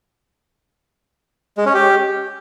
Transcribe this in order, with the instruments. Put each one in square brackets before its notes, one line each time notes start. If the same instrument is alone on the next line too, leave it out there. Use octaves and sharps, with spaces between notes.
[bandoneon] G#3
C#4
G4